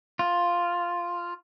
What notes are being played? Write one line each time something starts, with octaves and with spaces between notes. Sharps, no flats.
F4